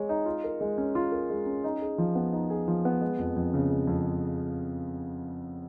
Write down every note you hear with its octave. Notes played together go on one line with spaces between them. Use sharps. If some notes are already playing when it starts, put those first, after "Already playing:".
Already playing: G#3 G#4 C#5
D#4
F4
A#4
G#3
C#4
F4
A#4
G#3
C#4
D#4
G#4
F3
B3
D#4
G#4
F3
B3
G#3
F2
F2
C#3
G#3
F2